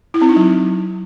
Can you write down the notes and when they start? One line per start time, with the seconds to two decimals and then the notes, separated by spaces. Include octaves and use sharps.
0.14 E4
0.22 C4
0.29 D#4
0.36 F#3